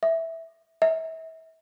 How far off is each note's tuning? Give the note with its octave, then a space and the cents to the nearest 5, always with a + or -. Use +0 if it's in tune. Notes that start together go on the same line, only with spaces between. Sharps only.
E5 -5
E5 -35